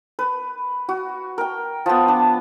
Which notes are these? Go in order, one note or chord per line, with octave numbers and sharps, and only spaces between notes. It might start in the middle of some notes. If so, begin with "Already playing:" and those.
B4
F#4
A#4 G5
F3 B3
D4